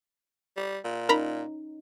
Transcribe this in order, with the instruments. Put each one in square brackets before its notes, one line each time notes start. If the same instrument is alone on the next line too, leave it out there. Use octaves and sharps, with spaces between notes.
[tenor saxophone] G3
A#2
[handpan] C#4 D#4 [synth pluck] A#4 A#5 B5